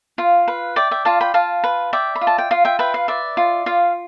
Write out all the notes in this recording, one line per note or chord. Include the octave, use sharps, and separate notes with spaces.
F4 F5
B4
D5 E5 G5
E5 G5
F4 F5 A5
G5 B5
F4 F5 A5
B4
D5 E5 G5
B5
F4
A5
G5
F4 F5
E5 G5
B4 E5 G5
F5
D5 E5
F4
F4 F5